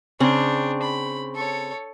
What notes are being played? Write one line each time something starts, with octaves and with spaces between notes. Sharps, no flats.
C#3 C4 D4
B5
A4 C#5